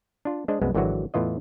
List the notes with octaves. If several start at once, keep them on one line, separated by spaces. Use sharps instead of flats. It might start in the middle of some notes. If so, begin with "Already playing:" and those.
D4 F4
G#3 D4 C5 D#5
C2 F#2 G#3 B3
G#1 D3 E3 F#3 F#4
E2 A2 E3 F4 D#5